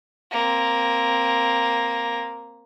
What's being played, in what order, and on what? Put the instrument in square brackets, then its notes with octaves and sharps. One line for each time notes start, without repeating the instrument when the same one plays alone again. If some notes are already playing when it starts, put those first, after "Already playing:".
[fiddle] A#3 C4